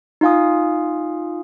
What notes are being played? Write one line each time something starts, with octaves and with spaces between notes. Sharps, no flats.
D#4 F4 F5 G#5 D#6